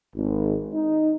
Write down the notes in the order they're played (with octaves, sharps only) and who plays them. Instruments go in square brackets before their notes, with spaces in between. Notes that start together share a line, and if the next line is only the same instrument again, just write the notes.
[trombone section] G#1
D#4